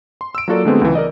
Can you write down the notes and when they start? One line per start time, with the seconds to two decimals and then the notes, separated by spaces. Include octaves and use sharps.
0.21 C6
0.35 E6 D7
0.48 F#3 A#3 F4 F#4 A4 D5
0.65 D3 F#3 G#3 A3 B3 C4
0.81 C#2 E3
0.95 A#4 D5 D#5